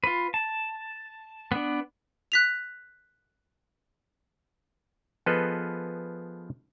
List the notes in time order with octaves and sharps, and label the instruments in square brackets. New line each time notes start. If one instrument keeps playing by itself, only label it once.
[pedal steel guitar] F4 B4
A5
B3 D4
[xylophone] F#6 B6 F7
[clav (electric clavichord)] F3 B3 G#4 A4 B4 D#5